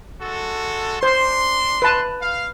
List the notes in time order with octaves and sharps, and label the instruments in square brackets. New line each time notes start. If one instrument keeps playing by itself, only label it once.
[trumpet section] G#3 F#4 A4
[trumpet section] D4 C6 [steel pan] C5
[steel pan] B4 A5
[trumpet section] F5